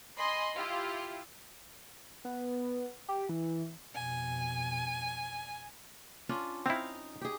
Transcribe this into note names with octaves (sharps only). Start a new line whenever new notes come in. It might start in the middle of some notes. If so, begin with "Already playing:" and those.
D#5 G#5 B5 C6
E4 F4 G4
B3
G4
E3
F2 B2 G#5
C#4 D4 F4
C4 D#4 E4 F5
G4 G#4